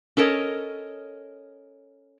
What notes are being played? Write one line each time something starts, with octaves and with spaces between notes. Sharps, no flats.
C#4 A4 A#4 C#5 D#5